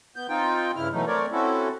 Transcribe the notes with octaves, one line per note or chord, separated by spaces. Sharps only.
B3 G6
C4 D#4 F4 G5
G2 C#3 E4 F6
B2 E3 F#3 A3 D#4
A3 C4 A#4 C#5 D5
C4 C#4 E4 F#4 A4